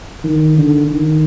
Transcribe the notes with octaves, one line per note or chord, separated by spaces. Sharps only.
D#3
D3
D#3